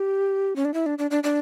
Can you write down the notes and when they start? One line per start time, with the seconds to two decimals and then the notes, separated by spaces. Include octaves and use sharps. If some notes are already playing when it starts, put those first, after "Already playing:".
Already playing: G4
0.56 C#4
0.65 D4
0.74 E4
0.86 D4
0.98 D4
1.11 D4
1.24 D4